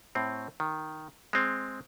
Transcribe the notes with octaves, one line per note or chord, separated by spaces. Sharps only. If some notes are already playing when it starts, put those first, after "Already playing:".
A2 C4
D#3
G#3 C4